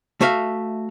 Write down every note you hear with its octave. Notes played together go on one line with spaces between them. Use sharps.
A3 F#4 E5 F5